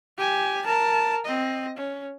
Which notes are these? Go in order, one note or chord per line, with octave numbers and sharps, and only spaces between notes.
G4 G#5
A#4 A5
C4 D#5
C#4